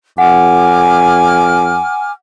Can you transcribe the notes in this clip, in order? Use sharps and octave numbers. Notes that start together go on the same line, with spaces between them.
F2 F#5 G#5 D6 F6